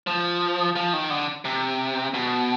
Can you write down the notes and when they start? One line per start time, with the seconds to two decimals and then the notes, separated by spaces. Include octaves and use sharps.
0.07 F3
0.76 F3
0.93 D#3
1.10 D3
1.45 C3
2.14 B2